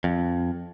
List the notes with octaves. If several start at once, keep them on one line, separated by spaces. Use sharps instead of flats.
F2